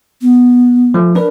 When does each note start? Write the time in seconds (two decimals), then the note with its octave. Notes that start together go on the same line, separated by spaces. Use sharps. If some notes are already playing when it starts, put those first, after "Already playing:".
0.21 B3
0.94 F3 A3
1.15 D4 A#4 B4